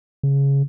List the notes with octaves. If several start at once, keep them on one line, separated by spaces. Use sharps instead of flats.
C#3